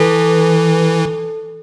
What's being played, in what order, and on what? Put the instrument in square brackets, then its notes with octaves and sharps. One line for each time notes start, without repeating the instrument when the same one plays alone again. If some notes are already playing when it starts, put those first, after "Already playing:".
Already playing: [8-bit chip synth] E3 [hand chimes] A4